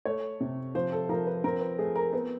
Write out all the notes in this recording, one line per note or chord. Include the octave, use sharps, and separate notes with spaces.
A3 C#5
C3
F3 C5
A4
F3 A#4
B4
C4 A#4
B4
A3 G#4
A#4
B3